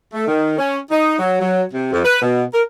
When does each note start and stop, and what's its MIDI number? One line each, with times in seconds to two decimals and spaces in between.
0.14 0.27 57
0.28 0.58 51
0.58 0.80 61
0.91 1.15 63
1.19 1.36 54
1.41 1.63 54
1.74 1.91 48
1.93 2.01 41
2.05 2.20 71
2.22 2.43 47
2.54 2.62 70